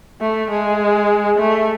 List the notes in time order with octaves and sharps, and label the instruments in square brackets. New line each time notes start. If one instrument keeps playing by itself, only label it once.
[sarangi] A3
G#3
A3